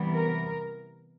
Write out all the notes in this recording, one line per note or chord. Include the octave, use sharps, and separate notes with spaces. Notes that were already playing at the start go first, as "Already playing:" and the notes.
Already playing: C3 E3 G3 B3
A#4